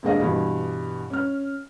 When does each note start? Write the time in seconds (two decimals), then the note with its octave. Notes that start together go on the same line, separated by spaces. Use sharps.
0.03 D#1 G#3 D4 G#4 D#5 F5
0.20 G2 B2 E3
1.10 C#4 F6